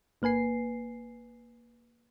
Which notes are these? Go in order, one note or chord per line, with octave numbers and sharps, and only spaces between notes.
G1 A#3 B4 G#5 C7